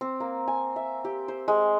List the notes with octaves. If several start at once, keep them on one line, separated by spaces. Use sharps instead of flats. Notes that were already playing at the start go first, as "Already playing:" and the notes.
C4
A#3
G#5
E5
G4
C5
G#3